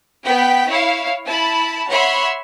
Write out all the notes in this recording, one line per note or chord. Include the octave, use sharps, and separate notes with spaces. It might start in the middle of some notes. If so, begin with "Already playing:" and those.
B3 G5 B6
E4 C#5 F5
E4 A5 B5
C#5 E5 F#5 B5 C6